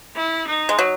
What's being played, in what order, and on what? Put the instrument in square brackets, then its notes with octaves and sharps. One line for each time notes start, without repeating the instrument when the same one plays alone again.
[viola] E4
D#4
[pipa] G#3
F#3